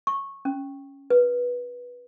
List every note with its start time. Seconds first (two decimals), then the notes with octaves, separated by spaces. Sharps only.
0.07 C#6
0.45 C#4
1.10 B4